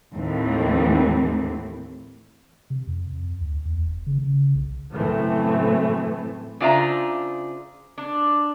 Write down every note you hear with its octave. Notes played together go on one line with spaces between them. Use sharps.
D#2 A2 E3 A3 C4
C3
F2
F2
D2
E2
F1
C#3
C#3
B1
F#1 A2 E3 A3 C4
C#3 D4 F4 C5 E5 A#5
D4